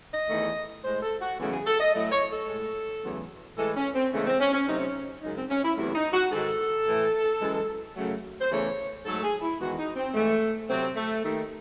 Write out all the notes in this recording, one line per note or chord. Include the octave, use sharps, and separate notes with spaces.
D#5
E2 D#3 A3
A2 G#3 C5
A4
F#4
E2 C#3 F#3 A3 G#4
G#4
A4
D#5
A2 F#3 A3 D#5
C#5
A4
A2 G#3
E2 C#3 F#3 A3
A2 E3 G#3 A4
C#4
C4
E2 C#3 G#3 A3
C4
C#4
C#4
C3 F#3 A3 D#4
C#4
F#2 C#3 G#3 D#4
C4
C#4
E4
E2 C3 F#3 A3 E4
D#4
F#4
G#2 D#3 G#3 A4
A2 E3 A3
F#2 E3 G#3
F#2 C#3 F#3 A3
C5
E2 C#3 E3 A3 C#5
G#2 F#3 A3 A4
G#4
E4
E2 D#3 G#3 F#4
D#4
C4
G#2 E3 G#3 A3
C3 F#3 A3 C4
A3
D#2 D#3 A3